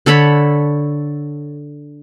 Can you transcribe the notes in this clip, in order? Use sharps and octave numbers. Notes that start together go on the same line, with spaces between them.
D3 A4 C#5 B5